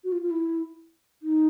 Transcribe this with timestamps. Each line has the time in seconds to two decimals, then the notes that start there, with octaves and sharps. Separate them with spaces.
0.04 F#4
0.12 F4
0.23 F4
0.31 E4
1.23 D#4